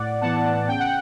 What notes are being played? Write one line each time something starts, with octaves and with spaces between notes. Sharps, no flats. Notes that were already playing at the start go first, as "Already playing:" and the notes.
Already playing: A2 D5 F#5
E3 B3 F#5 A5
C#3 G5
F#5